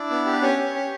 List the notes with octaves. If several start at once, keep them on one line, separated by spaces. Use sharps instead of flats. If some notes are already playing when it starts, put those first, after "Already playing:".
Already playing: D4 E4 D5
B3
G4
B4
C#4 G4 C#5
G4
C#4